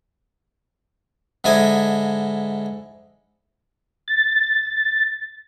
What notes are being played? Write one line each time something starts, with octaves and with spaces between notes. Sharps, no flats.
G#2 D3 E4 D#5 G#5
A6